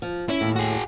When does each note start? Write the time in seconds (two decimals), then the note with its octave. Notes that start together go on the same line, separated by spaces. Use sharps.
0.02 F3
0.29 C#4 E4
0.41 D#2 A2
0.56 F#4 G#4